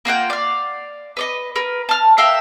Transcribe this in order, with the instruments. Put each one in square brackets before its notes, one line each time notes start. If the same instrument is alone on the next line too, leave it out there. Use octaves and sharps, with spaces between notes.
[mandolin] A#3 F4 F#5 G5
D5 F5
B4 D5 D#5
A#4 B4
A5 F6
A#4 E5 F5 G5